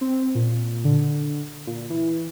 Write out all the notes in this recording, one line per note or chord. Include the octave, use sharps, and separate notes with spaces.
C4
A#2
D3
A#2
E3